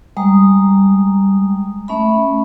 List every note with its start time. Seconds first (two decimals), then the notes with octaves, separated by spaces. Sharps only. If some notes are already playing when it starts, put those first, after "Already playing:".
0.17 G3 G#3 A#5 D#6
1.88 A3 C#4 E5 B5